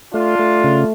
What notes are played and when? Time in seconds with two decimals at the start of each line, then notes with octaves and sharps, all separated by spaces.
0.14 A3 D4 F4
0.39 A3
0.64 C#3